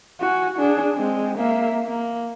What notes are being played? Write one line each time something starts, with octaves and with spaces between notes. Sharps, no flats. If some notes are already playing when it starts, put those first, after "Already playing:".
F#4 G#5
D4 G#4
G#3 C4
A#3 E5
A#3